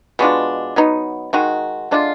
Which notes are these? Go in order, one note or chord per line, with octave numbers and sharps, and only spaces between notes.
B2 G#3 D4 F4
F#3 B3 D#4
D#3 G#3 D#4 F#4
D3 G#3 D4 F4